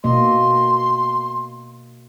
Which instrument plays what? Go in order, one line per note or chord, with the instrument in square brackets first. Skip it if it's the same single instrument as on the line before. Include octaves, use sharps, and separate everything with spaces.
[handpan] B2 A#3 D#5 [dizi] C6